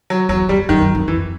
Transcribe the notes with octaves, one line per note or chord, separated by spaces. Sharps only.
F#3
E2 F#3
F2 G3
F#2 D#3
F#2
F2
F2 E3